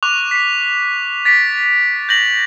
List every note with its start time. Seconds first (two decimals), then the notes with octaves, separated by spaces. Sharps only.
0.03 C#6 D6 F#6 F7
0.31 B6 C7
1.25 A6 B6 D7
2.09 G6 A#6 F#7